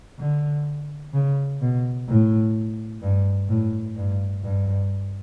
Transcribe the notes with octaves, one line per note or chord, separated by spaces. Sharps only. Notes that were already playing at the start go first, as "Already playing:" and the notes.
D3
C#3
B2
A2
G2
A2
G2
G2